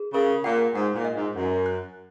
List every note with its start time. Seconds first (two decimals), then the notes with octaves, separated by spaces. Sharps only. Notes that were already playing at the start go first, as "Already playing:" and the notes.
Already playing: G#4
0.14 C#3 A#4
0.44 A#2 F#5
0.75 G#2 F#5
0.95 A#2
1.05 D#5
1.15 G#2
1.36 F#2 F#5
1.66 F#6